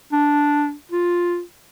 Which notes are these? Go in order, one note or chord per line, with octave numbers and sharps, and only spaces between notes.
D4
F4